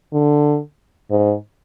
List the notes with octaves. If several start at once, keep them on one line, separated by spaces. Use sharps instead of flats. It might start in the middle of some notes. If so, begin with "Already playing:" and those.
D3
G#2